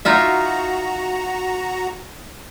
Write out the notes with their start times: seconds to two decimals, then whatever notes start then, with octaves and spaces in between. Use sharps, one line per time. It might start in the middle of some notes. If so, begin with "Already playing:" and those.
0.05 D#4 F4 F#4 E5 A#5